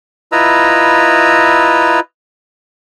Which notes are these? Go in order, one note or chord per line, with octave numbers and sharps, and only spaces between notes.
E4 F4 B4 D#5 A#5 E6